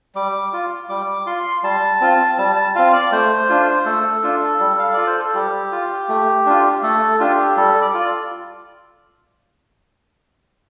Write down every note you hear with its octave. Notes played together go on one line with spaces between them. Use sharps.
G3 D6
F4
G3 D6
F4 C6
G3 A5
C4 F4
G3 A5
A5
C4 F4 F5
D5
A3 C5
D4 F4
A3 A4
D4 F4
G3
F5
F4 D5
C5
A4
G3 G4
F4
A3
D4 F4
A3 A4
D4 F4 G4
G3 A4
D5
F4